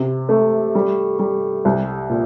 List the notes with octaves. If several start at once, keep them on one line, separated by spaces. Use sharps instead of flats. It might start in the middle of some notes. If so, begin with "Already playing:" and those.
Already playing: C3
A3
G3
G3
C2
A#2